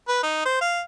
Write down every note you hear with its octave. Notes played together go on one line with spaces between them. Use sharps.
B4
D#4
C5
F5